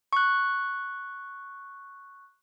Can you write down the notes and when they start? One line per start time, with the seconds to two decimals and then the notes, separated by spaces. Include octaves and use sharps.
0.13 C#6 F#6